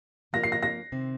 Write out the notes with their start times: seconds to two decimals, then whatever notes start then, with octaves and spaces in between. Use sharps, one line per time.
0.33 F3 A#3 F4 A#4 A#6
0.44 C7
0.52 A#6
0.63 A#6
0.92 C3 D#3 C4